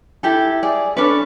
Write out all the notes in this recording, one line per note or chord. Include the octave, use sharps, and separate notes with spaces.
E4 G4 A4
G#4 D5
C#4 D4 A4 B4